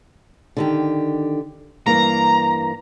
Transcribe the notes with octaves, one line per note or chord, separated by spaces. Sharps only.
D3 D#3 G4
G2 E3 A#3 A#5